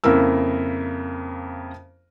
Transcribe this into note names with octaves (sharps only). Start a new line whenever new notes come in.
F2 C#3 A#3 E4 A#4 E6